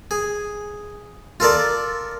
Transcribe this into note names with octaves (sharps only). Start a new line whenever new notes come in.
G#4
F4 A4 A#4 D5